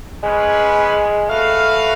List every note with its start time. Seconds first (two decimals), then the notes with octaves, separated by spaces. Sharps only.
0.23 G#3 C#4 G#4 B4
1.29 A3 F#4 B4 F5